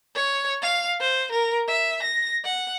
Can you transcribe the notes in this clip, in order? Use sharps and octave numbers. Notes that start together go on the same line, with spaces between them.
C#5
F5
C5
A#4
E5
A#6
F#5